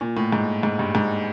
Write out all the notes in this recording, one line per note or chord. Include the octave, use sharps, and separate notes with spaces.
A#2
A2
G#2
G#2
G2
G#2